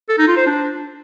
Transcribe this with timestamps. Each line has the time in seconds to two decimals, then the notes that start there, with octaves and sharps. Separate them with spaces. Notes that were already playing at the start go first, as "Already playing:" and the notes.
0.09 A4
0.18 D#4
0.28 F4
0.37 C5
0.46 D4